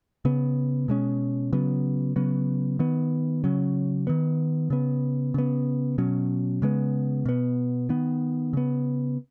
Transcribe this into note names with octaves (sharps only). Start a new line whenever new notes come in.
C#3 B3
B2 G#3 C#4
C#3 F#3 B3
C#3 F#3 B3
D#3 B3
C#3 F#3 C#4
D#3 B3
C#3 B3
C#3 B3
B2 F#3 C#4
C#3 G#3 B3
B2 B3
D#3 B3
C#3 B3